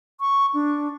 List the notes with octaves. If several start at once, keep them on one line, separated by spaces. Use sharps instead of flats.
C#6
D4